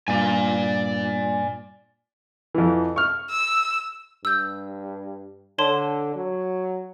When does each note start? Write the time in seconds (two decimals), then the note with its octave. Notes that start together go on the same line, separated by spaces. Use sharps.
0.08 G2 A#2 D5 G#5
2.55 F2 E3
2.96 C#6 F6
3.30 E6
4.25 G2 E6 G6
5.58 D3 C#5 A5 C6
6.16 F#3